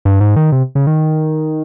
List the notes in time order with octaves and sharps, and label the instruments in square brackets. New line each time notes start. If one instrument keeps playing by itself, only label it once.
[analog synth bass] G2
G#2
D#3
C3
C#3
D#3